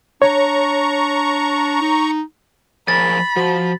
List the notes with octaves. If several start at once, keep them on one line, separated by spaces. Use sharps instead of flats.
D4 C#5 A#5 C#6
D#4
F3 G#4 A#4 B5 A6
F3 F#4